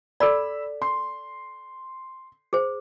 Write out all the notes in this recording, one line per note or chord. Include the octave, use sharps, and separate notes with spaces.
A4 D5 B5 E6
C6
G#4 C5